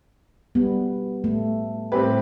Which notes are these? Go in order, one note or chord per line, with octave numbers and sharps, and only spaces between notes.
G3 B3
A3
A2 G3 C4 G4 B4